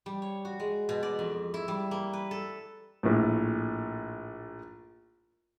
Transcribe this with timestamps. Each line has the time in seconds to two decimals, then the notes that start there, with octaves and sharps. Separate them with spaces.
0.06 G3
0.22 C#5
0.45 F#4
0.60 G#3
0.89 B2
1.03 D5
1.19 F2
1.54 E4
1.68 G3
1.91 A#3
2.13 B4
2.31 A4
3.03 A#1 A2